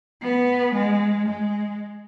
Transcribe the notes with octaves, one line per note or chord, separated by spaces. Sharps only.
B3
G#3
G#3